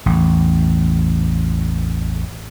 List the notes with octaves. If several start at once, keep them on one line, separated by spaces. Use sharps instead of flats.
A1 E2